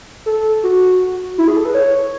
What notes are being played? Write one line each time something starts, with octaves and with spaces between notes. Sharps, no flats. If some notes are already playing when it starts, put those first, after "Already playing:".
A4
F#4
E4
G#4
A4
B4
C#5